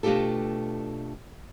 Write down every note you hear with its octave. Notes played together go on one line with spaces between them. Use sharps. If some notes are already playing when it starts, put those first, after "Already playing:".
B2 A3 D4 F4 G4 A4